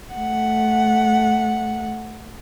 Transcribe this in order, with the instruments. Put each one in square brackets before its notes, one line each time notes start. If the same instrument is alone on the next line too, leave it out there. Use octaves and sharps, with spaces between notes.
[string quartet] A3 F#5